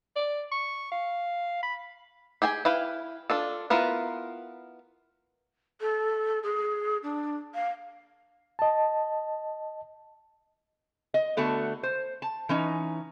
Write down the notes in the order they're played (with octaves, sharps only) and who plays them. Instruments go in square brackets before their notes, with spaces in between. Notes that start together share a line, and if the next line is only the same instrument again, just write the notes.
[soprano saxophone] D5
C#6
F5
B5
[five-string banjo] G4 G#4 G5 G#5
E4 B4 F5 G5
D4 F4 A4
B3 E4 F4 A#4 B4
[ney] A4
G#4
D4
F5
[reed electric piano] D#5 A5
[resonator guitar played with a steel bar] D#5
D3 A3 B3 F#4 A5
C5
A5
E3 C#4 D#4